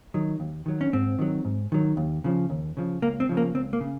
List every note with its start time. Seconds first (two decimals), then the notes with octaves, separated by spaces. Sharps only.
0.14 D#3 F#3
0.40 D#2
0.66 D#3 F#3
0.81 C#4
0.93 G#2 C4
1.19 D#3 F#3
1.45 G#2
1.72 D#3 F#3
1.97 D#2
2.24 C#3 F3
2.50 D#2
2.77 C#3 F3
3.02 C#2 A#3
3.20 C4
3.29 C#3 F3
3.37 A#3
3.55 C#2 C4
3.73 A#3
3.81 C#3